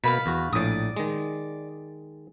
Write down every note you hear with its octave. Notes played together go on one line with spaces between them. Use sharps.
B2 A#3 F5 B5
E2 F#4
A#1 A2 D5 D#6
D#3 G#3